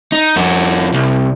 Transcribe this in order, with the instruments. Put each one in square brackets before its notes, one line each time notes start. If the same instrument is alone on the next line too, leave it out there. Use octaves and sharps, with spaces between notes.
[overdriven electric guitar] D#4
F2 F#4
C2